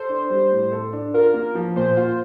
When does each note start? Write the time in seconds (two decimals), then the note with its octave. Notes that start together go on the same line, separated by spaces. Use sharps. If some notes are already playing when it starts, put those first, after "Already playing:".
Already playing: A4 C5
0.09 D4
0.30 G3
0.51 A2
0.72 A4
0.93 D4
1.14 F4 A#4
1.34 A#3
1.55 F3
1.76 A#2 C5
1.97 F4